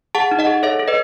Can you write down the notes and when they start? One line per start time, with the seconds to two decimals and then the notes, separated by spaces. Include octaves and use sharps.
0.15 G#4 F#5 A5
0.31 D#4
0.39 D#5 F#5
0.47 G#4
0.63 A4 C#5 E5
0.79 A4
0.88 B4 D#5